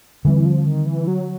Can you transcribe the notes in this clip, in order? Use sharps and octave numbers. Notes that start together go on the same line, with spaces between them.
D3 E3 G3 C4
F3
D#3
E3
F#3